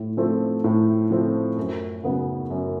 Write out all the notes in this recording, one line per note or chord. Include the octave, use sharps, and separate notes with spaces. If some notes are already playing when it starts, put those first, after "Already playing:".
Already playing: A2
F3 A3 C4
A2
F3 A3 C4
F#2
C#3 F#3 B3
F#2